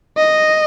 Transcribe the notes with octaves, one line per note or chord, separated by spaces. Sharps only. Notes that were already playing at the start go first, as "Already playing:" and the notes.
D#5